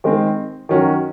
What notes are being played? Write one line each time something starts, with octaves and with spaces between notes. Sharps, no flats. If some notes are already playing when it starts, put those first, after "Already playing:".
D#3 G#3 C4
D#3 F#3 C#4 F#4 A#4